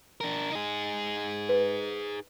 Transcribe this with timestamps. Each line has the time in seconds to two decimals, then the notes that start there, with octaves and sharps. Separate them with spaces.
0.21 D4 A#4
0.51 D#4 G#4
1.49 B4